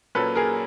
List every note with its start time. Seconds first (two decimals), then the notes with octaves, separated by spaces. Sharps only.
0.15 A#2 F#3 A#3 C#4 A4 B4
0.35 G#4 A#4